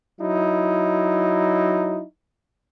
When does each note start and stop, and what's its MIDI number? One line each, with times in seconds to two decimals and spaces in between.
0.20 2.02 54
0.20 2.02 63
0.20 2.02 64